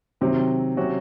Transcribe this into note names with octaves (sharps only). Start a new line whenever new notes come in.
C3 D#3 F#3 C4
C3 F#3 C#4 F#4